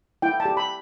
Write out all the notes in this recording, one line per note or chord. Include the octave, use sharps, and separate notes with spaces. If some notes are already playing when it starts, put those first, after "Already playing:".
E4 G5
A5
G4
B5